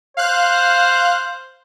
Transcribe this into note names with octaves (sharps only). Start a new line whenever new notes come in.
C5 F5 F#6